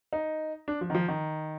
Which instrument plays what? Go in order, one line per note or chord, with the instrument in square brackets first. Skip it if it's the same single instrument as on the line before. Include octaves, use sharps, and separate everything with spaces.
[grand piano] D#4
D4
F3
D#3
F3
D#3